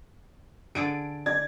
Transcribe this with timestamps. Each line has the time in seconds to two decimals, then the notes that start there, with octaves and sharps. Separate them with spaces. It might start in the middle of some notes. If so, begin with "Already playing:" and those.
0.75 D3 G#4 A4 D7
1.26 D5 G#6